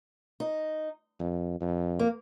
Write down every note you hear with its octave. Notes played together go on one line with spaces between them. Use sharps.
D#4
F2
F2
A#3